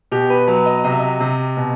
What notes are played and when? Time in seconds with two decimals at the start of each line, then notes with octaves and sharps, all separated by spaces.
0.12 B2 G4
0.30 B4
0.48 F#3 B4
0.66 D#5
0.84 C3 D#5
0.91 E5
0.99 D#5
1.20 C3
1.57 B2